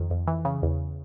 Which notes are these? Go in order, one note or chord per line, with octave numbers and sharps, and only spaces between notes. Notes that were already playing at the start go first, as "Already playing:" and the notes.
Already playing: F2 D#3
F2
E3
C#3
E2